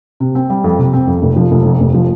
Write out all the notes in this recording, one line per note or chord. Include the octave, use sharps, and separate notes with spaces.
C3
C4
G3
F2
C3
C4
F2
F1
F3
F1
F2
F1
F3